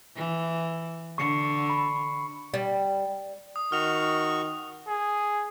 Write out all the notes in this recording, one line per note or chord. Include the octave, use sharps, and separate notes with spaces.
E3
D3 C#6 C7 C#7
B5
G3
D#6
D#3 F#4 C#6 F6 F7
G#4